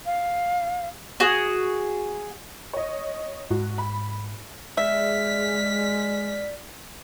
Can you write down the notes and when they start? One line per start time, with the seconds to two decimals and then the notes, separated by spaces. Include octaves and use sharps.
0.06 F5
1.20 F#4 G#4
2.73 C#5 D#5
3.51 G#2 F#4
3.78 B5
4.77 G#3 D5 E5 F6 B6